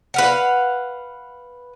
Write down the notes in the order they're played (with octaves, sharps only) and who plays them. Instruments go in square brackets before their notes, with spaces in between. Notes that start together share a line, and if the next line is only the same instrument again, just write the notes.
[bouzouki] B4 F5 F#5